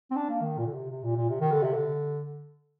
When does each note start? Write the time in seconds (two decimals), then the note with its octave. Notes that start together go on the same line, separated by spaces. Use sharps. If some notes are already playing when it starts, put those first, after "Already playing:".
0.11 C4
0.16 D4
0.29 A#3
0.42 D#3
0.58 A#2
0.67 D3
0.74 C3
0.91 C3
1.04 A#2
1.16 A#2
1.29 C3
1.41 D#3
1.52 D3
1.63 C3
1.74 D3